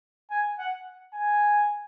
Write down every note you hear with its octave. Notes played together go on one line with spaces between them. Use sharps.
G#5
F#5
G#5